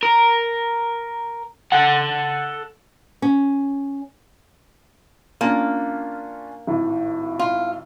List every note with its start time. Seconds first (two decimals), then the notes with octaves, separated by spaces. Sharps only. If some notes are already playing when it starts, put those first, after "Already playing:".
0.03 A#4
1.72 A4 F#5
3.22 C#4
5.41 A#3 C#4 D4 F4
6.67 G#1 A2
7.39 F4